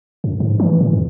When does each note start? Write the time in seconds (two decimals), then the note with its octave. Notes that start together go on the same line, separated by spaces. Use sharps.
0.24 F#2
0.40 G#2
0.60 E3
0.81 A2
0.93 F2